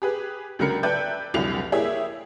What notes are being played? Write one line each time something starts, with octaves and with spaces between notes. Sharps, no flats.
G4 G#4 B4
C#2 D3 F#3 A#4 A#5 C#7
B4 D5 E5 G5 A5 G6
F1 C2 D3 F#3 C7 F7
A#3 E4 G4 G#4 C#5 E5